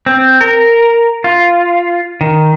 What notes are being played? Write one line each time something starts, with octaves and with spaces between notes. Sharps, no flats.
C4
A#4
F4
D#3